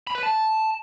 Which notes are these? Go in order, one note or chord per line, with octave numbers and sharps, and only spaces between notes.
B5
B4
A5